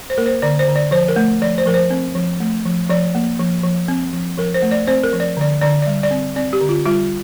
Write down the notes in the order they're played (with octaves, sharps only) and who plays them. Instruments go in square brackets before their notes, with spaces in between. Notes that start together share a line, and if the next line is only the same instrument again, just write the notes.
[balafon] C5
A#3 A#4
C5
D3 D5
C5
D3
D5
F3 C5
A#4
A3
F3 D5
C5
F3 A#4
C5
C4
F3
A3
F3
F3 D5
A#3
F3
F3
C4
F3
F3 A#4
C5
A3
D5
C4 C5
A#4
F3
D5
D3 D5
D3 D5
G3 D5
D5
C4
C4 D5
G4
D3
F4
G3 F4